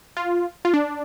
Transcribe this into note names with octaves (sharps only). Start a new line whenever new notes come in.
F4
F4
D4